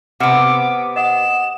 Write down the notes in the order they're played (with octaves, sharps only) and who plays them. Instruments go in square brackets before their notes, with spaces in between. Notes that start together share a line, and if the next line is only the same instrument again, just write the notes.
[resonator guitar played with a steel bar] C3 B3 [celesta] F#5 F6 C#7 [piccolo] D6
[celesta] D#5 F#5 D#6 [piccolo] E7